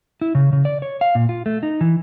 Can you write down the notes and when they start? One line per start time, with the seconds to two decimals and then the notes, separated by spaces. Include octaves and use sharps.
0.21 E4
0.35 C#3
0.53 C#3
0.65 D5
0.82 C#5
1.01 F5
1.15 A#2
1.29 F4
1.46 A3
1.63 D#4
1.81 E3